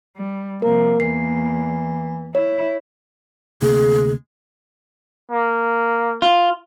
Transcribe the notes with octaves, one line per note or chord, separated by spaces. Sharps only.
G3
C3 F3 A#3 A#4
E2 E3 A#3 C7
E4 C#5 E5
D2 C3 A#3 G#4
A#3
F4